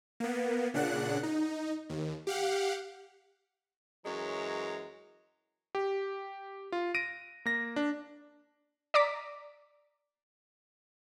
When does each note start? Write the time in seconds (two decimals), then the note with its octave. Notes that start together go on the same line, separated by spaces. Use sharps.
0.20 A#3 B3
0.74 A#2 C#3 D4 F#5 F#6
1.23 D#4
1.90 D#2
2.27 G4 F5 F#5
4.05 F#2 E3 G#3 C#5 A#5
5.75 G4
6.72 F4
6.95 A#6 D7 D#7
7.45 A#3 A#6
7.76 D4
8.94 D5 A#5 D6 B6